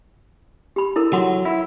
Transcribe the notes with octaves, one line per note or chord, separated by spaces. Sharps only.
G4 B5
E4 A4 A#4
F#3 F#5 C6
E4